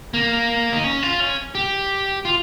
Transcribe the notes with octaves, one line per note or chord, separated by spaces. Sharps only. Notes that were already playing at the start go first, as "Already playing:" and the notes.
A#3
D#4
C#4
F4
C#4
G4
F4